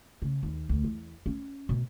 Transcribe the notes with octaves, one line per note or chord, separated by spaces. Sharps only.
C#3
D#2
D2
E2
C#4
B2